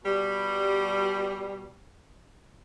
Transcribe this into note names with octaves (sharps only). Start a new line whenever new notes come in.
B2 G3